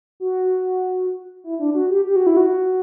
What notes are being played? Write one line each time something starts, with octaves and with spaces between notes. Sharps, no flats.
F#4
E4
D4
F#4
G4
G4
F#4
E4
F#4